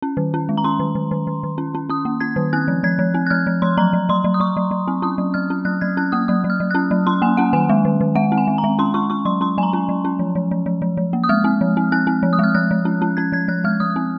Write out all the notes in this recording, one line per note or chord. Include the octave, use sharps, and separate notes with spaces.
C#4
D#3
C#4
G#3
A#5
C#4 C6
D#3
D#3
D#3
D#3
D#3
C#4
C#4
C#4 D#6
A#3
C#4 G#6
D#3
C4 F#6
F3
F3 G#6
F3
C4
F#6
F3 F6
F3
F3 C6
F#3 A#5
F#3
F#3 C6
F#3
D#6
F#3 C#6
F#3
F#3
C4
C#4 D#6
F#3
F#3 F6
C#4
F#3 F#6
F#3 G#6
C#4 F#6
A#3 D#6
F#3 D#6
F#3
F6
F#3
C#4 F#6
F#3
C#4 C6
A#3 G#5
C#4 F#5
D#3 G#5
G#3
D#3
D#3
G#3 F#5
C4
G#5
G#3
A#5
G#3
C#4 C6
C#4 C#6
C#4 C#6
F#3 C6
C#4 C6
F#3 G#5
A#5
C#4
F#3
C#4
F3
F3
F3
F3
F3
F3
A#3
D#6
G#3 F6
C4
F3
C4
C4 F#6
C4
F3
D#6
G#3 F6
F3 F#6
F3
C#4
C#4
C#4 G#6
F3 G#6
F3 F#6
G#3 F6
F3 D#6
C4